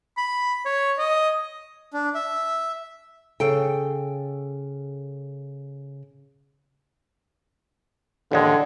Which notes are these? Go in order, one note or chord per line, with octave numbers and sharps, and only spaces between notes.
B5
C#5
D#5
D4
E5
C#3 A4 G5
A1 D#2 D3 G#3